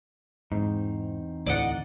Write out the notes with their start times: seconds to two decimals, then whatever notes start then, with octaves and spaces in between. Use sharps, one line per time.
0.52 E2 G#2 C4 D#4
1.46 D2 A2 D5 D#5 F#5